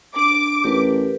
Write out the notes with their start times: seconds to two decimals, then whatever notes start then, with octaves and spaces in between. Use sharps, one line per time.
0.16 D4 D6
0.64 A1 G4 A#4 B4